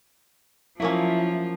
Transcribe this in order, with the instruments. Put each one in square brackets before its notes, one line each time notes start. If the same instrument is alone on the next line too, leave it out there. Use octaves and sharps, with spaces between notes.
[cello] F3 [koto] F#3 A#3 C#4 [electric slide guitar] E4